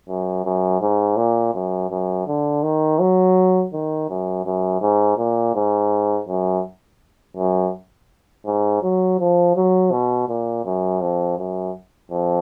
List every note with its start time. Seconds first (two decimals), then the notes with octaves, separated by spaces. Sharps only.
0.08 F#2
0.44 F#2
0.81 G#2
1.17 A#2
1.54 F#2
1.91 F#2
2.27 D3
2.63 D#3
2.99 F#3
3.73 D#3
4.09 F#2
4.46 F#2
4.81 G#2
5.18 A#2
5.55 G#2
6.28 F#2
7.37 F#2
8.46 G#2
8.83 F#3
9.19 F3
9.56 F#3
9.91 B2
10.29 A#2
10.65 F#2
11.01 F2
11.38 F#2
12.11 F2